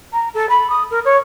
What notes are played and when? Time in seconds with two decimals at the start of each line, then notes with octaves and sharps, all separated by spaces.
0.13 A#5
0.34 A4
0.49 B5
0.70 D#6
0.91 A#4
1.05 C#5